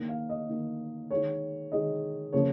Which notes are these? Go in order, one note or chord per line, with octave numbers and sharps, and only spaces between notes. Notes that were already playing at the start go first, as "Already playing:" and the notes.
Already playing: D#3 A#3
F5
D#5
D#3 A#3
D#3 G#3 C#5
D#3 G#3 D#5
C#3 F3 A#3 C#5